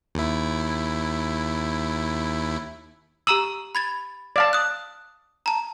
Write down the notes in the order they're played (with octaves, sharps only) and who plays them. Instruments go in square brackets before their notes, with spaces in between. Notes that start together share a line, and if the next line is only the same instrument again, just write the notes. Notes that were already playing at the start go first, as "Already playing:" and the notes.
[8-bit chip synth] D#2 E4
[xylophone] G4 A#5 F#7 [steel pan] D#6 E6
[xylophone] B5 G#6 A6
[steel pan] D5 F5 A5
[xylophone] D#6 F#6
A5 A#5